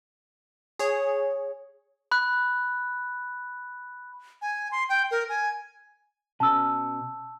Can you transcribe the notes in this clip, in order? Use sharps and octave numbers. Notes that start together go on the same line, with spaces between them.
G#4 C#5
B5 F#6
G#5
C6
G5
A#4
G#5
B2 C#4 A5 E6